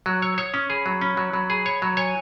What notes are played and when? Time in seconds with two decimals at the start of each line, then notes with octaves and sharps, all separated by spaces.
0.06 F#3 F#6
0.22 C#5 E6
0.38 C#5 D#6
0.54 C#4 C#6
0.69 G#4 B5
0.86 F#3
1.01 C#4
1.17 F#3
1.33 F#3
1.50 G#4
1.66 C#5
1.82 F#3
1.97 C#5 G#5